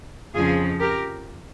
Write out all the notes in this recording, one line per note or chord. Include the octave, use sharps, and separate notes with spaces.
F2 C#3 F3 F4 G#4
G4 A#4